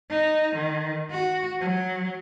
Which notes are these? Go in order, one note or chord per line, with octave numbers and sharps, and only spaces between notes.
D#4
D#3
F#4
F#3